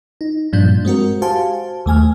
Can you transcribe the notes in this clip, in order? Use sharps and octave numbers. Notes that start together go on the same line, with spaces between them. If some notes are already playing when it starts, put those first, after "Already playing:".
D#4
G2 A#2 F3 D4 G6
G#3 C4 F#4 A#4
F#4 G4 C5 F5 G#5 A5
D#2 A3 G#5 F6